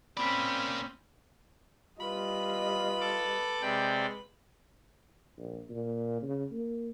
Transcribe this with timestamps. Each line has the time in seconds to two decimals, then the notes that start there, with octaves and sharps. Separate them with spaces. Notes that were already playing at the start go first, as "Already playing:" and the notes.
0.17 A#3 C4 C#4 D5 B5 B6
2.00 G3 F4 B4 D#5 B5
3.01 A4 D6
3.62 C3 G#3 D5 G5
5.38 A#1
5.70 A#2
6.23 C#3
6.52 A#3